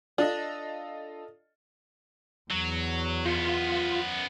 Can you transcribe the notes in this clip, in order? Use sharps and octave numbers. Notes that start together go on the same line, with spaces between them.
D4 F4 A4 D#5
E2 F#3
F#2 B3 F4